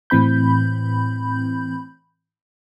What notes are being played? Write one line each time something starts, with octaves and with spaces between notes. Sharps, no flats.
A2 E3 C4 B5 G6